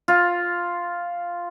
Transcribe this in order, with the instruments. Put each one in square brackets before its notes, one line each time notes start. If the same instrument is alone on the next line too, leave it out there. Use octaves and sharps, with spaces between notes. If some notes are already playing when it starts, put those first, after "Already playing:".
[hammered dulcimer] F4